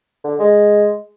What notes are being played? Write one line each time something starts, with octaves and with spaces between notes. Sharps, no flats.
D3
G#3